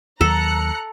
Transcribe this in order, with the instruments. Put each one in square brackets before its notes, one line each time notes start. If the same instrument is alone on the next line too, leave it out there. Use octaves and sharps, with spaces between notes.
[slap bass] D#2 F#3 [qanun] A4 [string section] A#5 F#6 C#7